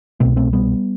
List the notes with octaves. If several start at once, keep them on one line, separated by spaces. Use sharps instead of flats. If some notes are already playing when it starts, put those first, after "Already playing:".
C2 B2 A3 C4
A3 C4
G3 B3